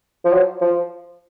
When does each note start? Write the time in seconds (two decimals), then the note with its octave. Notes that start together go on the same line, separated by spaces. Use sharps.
0.25 F3
0.33 F#3
0.62 F3